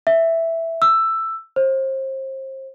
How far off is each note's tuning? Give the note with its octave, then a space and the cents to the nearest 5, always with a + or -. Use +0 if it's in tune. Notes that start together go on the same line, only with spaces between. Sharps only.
E5 +0
E6 +10
C5 +30